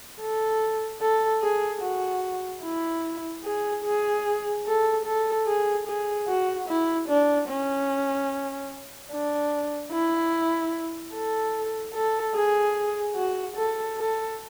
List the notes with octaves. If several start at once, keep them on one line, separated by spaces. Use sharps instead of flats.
A4
A4
G#4
F#4
E4
G#4
G#4
A4
A4
G#4
G#4
F#4
E4
D4
C#4
D4
E4
A4
A4
G#4
F#4
A4
A4